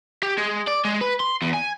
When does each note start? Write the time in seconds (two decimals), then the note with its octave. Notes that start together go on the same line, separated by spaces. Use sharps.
0.23 G4
0.38 G#3
0.67 D5
0.85 G#3
1.01 B4
1.20 C6
1.42 E2
1.54 G#5